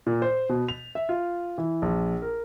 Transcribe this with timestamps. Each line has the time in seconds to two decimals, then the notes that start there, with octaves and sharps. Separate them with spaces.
0.06 A#2
0.22 C5
0.49 B2
0.68 F7
0.95 E5
1.09 F4
1.58 E3
1.82 A#1
2.22 A#4